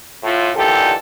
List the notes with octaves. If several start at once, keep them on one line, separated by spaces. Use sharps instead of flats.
A2 F4
D#2 A#2 D3 E3 G4 A4